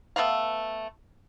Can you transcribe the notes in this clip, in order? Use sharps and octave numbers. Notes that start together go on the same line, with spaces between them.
A3 B3 B4 F5